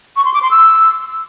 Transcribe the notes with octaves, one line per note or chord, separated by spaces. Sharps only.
C#6
C6
D6
C6
E6